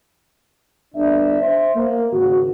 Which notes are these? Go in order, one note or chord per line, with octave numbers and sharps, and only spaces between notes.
G1 D4 E5
C5 E5
A#3
G#1 C#3 F#4